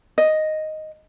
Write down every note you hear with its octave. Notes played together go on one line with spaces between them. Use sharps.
D#5